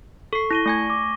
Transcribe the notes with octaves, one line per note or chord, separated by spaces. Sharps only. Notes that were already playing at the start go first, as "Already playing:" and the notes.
A4 C#6 C7
E4 A#6 D#7 G7
A3 G#5 G#6
D6